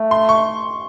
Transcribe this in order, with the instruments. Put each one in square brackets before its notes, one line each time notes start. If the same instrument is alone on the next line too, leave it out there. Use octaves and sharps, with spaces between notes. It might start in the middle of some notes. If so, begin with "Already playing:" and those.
Already playing: [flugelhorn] A3
[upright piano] C6
C#6